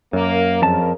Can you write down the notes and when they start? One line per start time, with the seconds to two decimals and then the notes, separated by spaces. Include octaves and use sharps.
0.13 F#2 A#3
0.62 F2 C#3 A#4 A5